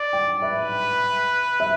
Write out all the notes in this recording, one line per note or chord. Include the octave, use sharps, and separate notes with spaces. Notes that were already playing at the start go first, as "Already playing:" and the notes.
Already playing: D5
G5
B4 E5
E5